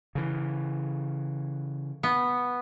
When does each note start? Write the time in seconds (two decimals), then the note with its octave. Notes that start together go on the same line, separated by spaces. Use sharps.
0.15 C#3 E3
2.03 B3